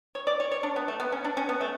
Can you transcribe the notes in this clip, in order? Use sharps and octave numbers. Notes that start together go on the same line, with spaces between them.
C#5
D5
C#5
C#5
D4
B3
A3
B3
C#4
D4
C#4
B3
A3